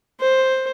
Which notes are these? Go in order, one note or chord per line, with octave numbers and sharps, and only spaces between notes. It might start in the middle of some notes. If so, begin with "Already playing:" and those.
C5